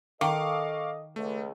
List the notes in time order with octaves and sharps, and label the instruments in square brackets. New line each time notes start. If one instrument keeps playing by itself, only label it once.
[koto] D#3 [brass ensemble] A4 D#5 [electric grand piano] F5 C#6 D6
[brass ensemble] C#2 [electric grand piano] A3